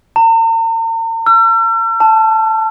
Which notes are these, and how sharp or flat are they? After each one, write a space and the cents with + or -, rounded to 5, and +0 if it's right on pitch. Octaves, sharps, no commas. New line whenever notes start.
A#5 -45
E6 +45
A5 +5